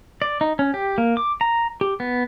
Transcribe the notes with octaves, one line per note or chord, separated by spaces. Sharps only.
D5
D#4
C#4
G4
A#3
D6
A#5
G4
B3